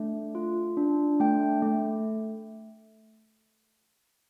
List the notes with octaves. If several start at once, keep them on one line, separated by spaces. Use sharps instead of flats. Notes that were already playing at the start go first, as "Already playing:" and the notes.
Already playing: A3 D4
F4
D4
A3 G5
A3